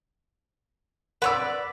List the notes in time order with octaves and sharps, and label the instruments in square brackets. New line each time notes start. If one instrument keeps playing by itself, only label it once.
[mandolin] B4 C#5 D5 [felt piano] F#5 E6